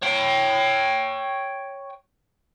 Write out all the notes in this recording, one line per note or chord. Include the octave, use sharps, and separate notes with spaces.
C#5 G5